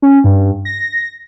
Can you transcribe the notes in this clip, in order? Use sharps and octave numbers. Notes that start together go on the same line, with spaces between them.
C#4
G2
A#6